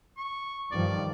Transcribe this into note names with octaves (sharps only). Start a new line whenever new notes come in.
C#6
G2 D#3 F3 D5